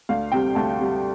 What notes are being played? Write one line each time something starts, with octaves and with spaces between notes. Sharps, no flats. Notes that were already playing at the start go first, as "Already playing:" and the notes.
D2 F5
C3 G3 G5
D2 A5
C3 G3